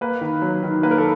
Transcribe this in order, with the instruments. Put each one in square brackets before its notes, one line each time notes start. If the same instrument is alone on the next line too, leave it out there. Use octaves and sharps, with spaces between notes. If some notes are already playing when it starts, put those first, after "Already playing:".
[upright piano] A#3 B4
D#3
F#3
D#3
A#3 B4
A#4
A4